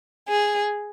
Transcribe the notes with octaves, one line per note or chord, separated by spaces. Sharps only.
G#4